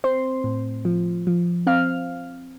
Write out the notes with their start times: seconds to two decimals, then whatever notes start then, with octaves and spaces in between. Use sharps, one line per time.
0.04 C4 C5 C6
0.44 A2
0.85 F3
1.27 F3
1.67 C4 F5 F6